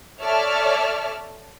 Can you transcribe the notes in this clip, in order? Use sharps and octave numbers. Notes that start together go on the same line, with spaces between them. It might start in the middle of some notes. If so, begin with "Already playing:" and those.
A4 C#5 D5 E5 A5 F6